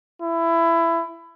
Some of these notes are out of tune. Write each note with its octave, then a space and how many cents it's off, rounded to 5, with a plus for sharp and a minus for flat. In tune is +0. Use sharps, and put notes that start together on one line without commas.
E4 +20